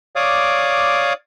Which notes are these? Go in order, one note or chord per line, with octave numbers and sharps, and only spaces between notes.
C#5 D5 F5 D6 D#6